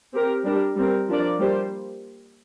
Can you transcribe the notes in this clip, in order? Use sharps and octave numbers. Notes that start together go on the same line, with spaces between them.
C4 G4 A#4
G3 D4 A#4
G3 C4 A#4
F3 D4 A#4 D5
G3 A#3 G4 C5